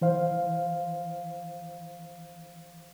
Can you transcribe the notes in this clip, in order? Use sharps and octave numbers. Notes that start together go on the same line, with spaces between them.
E3 C5 F5